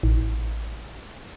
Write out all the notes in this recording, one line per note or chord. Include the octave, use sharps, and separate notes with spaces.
A1